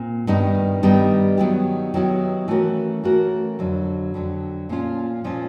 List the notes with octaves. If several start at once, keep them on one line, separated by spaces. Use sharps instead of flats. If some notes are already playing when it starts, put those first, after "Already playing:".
Already playing: A#2 C4
G2 D#3 G3 B3 D#4
G2 D#3 G3 B3 D#4
D#3 F#3 B3 E4 G4
D#3 F#3 B3 E4 G4
E3 A3 C#4 F#4 A#4
E3 A3 C#4 F#4 A#4
F2 D3 F#3
F2 D3 F#3
A#2 F3 A#3 C#4 F4
A#2 F3 A#3 C#4 F4